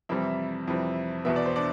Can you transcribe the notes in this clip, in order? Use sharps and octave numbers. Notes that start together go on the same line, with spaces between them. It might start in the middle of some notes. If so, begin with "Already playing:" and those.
F2 C3 E3 G3 C4 E4 E5
F2 C3 E3 G3 C4
E2 B2 B3 E5
D5
C5
D4 D5